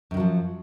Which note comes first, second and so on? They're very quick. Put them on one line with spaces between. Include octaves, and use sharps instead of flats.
F#2 D#3 F#3 F3